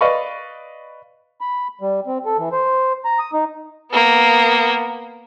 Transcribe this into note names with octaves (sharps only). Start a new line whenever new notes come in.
B4 D5 D#5 F5 B5 C#6
B5
G3
C4
A4
E3
C5
A#5
D#6
D#4
A#3 B3